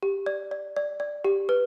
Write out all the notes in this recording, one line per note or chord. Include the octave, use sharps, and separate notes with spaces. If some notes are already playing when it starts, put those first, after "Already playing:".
G4
D5
D5
D5
D5
G4
B4